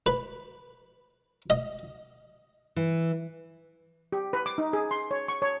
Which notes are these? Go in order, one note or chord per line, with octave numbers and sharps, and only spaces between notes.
B4
D#5
E3
G4
B4
D6
D#4
G#4
C6
C#5
C#6
C#5